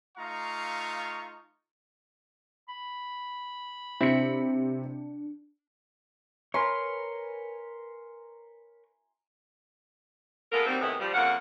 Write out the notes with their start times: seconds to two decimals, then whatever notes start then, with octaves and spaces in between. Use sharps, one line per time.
0.17 A3 D#4 F4 F5 A#5 C#6
2.69 B5
4.01 C3 C4 D4 E4 C#7
6.54 A#4 B4 C#5 G#5 A#5 C6
10.52 G#3 B3 F4 A4 A#4
10.66 D#3 F#3 G3 A#3 C4
10.81 A2 C3 D#3 B3 E4 G#4
10.99 F3 G3
11.14 F2 C#3 A#3 F5 F#5